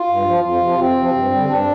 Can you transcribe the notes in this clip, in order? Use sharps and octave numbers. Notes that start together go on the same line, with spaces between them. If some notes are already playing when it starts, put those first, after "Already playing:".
Already playing: F4
G2
F3
F2 F4
C3 F3
F2 C4
C3 F3
G2
G3
D3
G2 D4